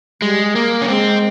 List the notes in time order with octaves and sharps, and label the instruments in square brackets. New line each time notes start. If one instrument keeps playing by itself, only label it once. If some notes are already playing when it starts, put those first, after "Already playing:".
[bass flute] G3 [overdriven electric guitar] G#3
[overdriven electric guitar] A#3
C#4
[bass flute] G#3 [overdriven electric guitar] C4